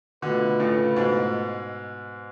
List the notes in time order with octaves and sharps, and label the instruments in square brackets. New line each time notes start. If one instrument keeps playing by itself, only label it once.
[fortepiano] B2 D3 [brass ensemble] A3 F4 B4
[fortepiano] A2 C#3
G#2 B2